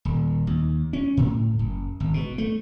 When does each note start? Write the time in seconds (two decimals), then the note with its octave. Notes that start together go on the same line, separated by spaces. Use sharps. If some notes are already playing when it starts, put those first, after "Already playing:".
0.05 D#1
0.47 D#2
0.93 C#4
1.17 A2
1.59 F#1
2.00 G#1
2.14 B2
2.38 A3